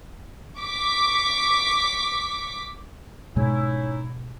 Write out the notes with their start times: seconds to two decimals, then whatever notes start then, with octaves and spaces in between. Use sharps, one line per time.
0.60 C#6 D6 B6
3.36 G#2 B2 G#3 C#4 D#4 E4